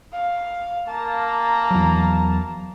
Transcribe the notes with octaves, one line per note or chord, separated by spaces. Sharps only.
F5
A#3 A5 A#5
E2 F#3